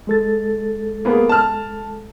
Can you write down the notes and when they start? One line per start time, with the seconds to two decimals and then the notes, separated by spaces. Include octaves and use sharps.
0.07 G#3 A4 A6
1.05 A#3 B3 G#4
1.29 A5 F6